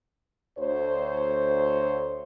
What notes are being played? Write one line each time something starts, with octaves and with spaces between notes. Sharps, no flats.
D2 C5 C#5